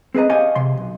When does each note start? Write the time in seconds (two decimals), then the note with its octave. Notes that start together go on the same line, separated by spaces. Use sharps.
0.14 C4 G#4 B4 D#5 A#5
0.29 G4 C5 C#5 D#5 F5 G#5
0.56 C3 C6
0.77 B1